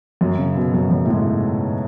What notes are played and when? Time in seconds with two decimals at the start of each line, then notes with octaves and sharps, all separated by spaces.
0.21 F#2
0.39 C#3
0.55 B2
0.74 F#2
0.91 F#2
1.05 A2
1.10 G#2